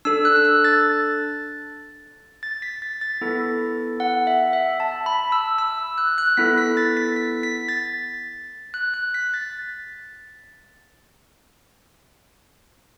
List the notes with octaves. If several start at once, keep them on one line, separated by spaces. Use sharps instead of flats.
D4 A4 E6
F#6
E6
F#6
A6
A6
B6
A6
A6
B3 E4 A4
F#5
E5
E5
A5
B5
E6
E6
F#6
F#6
B3 E4 A4 B6
B6
A6
B6
B6
B6
A6
F#6
F#6
B6
A6